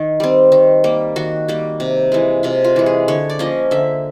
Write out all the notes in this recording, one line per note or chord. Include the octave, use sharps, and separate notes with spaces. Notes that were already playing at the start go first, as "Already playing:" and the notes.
Already playing: D#3
G3 C4
D#3
G3 A#3
D#3 F#4
G3 A#3
C3
E3 G#3
C3 F4
F4
E3 G#3
G#4
D3 C#5
D5
F3 A#3 C#4 D#5
D3 E5